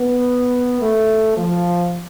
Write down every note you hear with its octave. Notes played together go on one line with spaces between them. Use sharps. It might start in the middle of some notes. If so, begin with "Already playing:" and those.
Already playing: B3
A3
F3